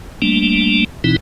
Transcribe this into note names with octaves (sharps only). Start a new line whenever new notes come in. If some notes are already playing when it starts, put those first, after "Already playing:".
G3 A3 A#3 D4
B2 E3 C4 D#4 E4